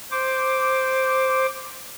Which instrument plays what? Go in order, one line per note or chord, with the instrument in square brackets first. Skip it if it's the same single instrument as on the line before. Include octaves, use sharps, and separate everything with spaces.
[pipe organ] C5 D6